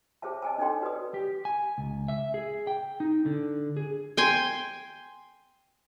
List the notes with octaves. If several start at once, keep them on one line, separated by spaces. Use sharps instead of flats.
G#4 C5 C#5 E5 A5
D#5 G#5 A5
D4 D#4 A4 C#5 G5 C6
F#4 B4 D5 D#6
G4
G#5
C#2
E5
G#4
G5
D#4
D3
G#4
G5 G#5 C6